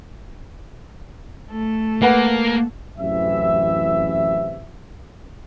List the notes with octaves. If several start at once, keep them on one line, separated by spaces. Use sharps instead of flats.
A3 A4
A#3 B4 F#5
A1 F#2 C3 E3 E5